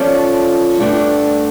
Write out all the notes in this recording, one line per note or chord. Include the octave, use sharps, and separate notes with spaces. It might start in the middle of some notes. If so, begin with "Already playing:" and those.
Already playing: F3 C#4 F4 A4 D5
G2 D3 A3 D4